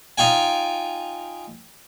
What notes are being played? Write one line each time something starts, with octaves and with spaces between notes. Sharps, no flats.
D#4 F4 G5 G#5